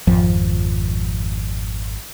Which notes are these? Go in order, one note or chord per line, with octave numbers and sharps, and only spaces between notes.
G#1 F2 F3